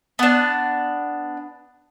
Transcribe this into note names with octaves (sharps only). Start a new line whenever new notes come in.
B3 D4